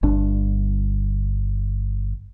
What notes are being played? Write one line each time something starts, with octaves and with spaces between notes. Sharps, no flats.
G1 G2 D4